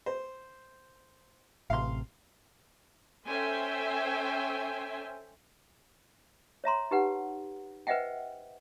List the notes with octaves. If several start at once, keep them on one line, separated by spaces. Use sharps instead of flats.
C5
A1 C3 F5 C6
C#4 A4 C5 E5 G5 G#5
C#5 E5 A#5 C6
D#4 G4 B4 F#5
B4 C5 D#5 E5 F#5 G5